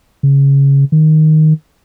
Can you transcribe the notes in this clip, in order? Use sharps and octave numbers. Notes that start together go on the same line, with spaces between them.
C#3
D#3